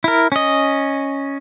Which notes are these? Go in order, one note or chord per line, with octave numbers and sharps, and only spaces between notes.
E4 A#4
C#4 D#5